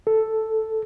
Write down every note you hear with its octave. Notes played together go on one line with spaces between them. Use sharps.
A4